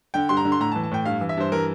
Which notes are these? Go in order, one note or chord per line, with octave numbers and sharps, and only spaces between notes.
D3 G5
G2 C6
A#5
D3
C6
A2 A#5
A5
E3
A5
A2 G5
G2 F5
E3
E5
G2 C5
E3 A#4